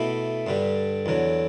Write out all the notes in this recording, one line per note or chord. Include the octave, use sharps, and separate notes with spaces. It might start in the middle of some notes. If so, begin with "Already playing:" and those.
Already playing: B2 A3 E4
G2 D3 G3
E2 D3 F#3